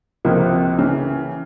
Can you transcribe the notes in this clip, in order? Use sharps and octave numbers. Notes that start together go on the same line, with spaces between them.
C#2 C3 F3 A#3
C#3 E3